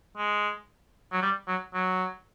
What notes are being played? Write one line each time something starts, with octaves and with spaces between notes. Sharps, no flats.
G#3
F#3
G3
F#3
F#3